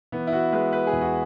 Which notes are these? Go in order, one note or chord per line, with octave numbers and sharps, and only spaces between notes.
E3 B3
E4
F#4
G#3 B4
B4
G#4
E2
F#4